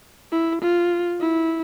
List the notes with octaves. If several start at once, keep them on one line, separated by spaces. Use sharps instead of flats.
E4
F4
E4